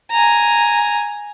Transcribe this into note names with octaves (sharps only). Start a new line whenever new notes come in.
G#5 A#5